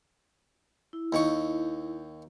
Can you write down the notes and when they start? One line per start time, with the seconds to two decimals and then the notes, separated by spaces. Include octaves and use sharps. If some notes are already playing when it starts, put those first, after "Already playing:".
0.93 E4
1.13 D#2 D#3 C#6